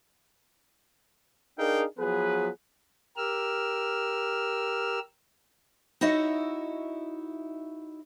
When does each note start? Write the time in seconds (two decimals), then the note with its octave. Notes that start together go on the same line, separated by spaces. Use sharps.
1.58 D4 D#4 G#4 A#4 F5 G5
1.98 F3 F#3 B3 G#4 B4
3.17 G4 A#4 E6 F6
6.01 D#4 E4 F#4 C#5 D#5 E5